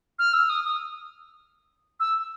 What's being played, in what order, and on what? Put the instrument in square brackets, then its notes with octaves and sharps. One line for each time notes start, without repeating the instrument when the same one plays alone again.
[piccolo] F6
E6
D#6
D#6
E6